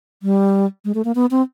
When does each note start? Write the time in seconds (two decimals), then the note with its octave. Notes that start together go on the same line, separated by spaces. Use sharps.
0.23 G3
0.85 G#3
0.95 A3
1.05 A#3
1.15 B3
1.31 C4